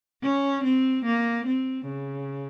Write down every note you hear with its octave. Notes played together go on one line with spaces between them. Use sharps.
C#4
C4
A#3
C4
C#3